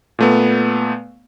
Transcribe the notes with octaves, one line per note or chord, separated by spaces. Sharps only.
A#2 A3 B3